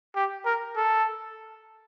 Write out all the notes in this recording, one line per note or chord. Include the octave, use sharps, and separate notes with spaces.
G4
A#4
A4